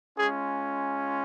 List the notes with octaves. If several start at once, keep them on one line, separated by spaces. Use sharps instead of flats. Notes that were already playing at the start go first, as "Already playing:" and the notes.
G#3 C#4 F4 G#4